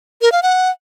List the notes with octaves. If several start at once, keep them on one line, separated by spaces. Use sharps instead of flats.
A#4
F5
F#5